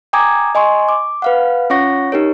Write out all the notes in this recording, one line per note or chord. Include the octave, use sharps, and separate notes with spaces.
G5 G#5 A#5 D6 D#6 G#6
D#5 G#5 C6 C#6
D6
B4 F5 F#5
C#4 F4 C#5 F#5 C#6 A#6
D#4 G4 A#4 C#5